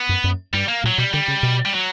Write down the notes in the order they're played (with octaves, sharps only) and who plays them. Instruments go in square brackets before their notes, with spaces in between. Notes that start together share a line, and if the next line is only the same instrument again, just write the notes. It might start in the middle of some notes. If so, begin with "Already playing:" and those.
Already playing: [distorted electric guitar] B3
[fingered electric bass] F#2
F#2
[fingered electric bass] G2 [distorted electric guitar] G3
[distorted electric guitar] A#3
[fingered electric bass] A#2
[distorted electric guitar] F#3
[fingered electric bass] B2 [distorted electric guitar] G3
[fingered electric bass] D3 [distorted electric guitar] G3
[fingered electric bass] C#3
B2
[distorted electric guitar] G3
F#3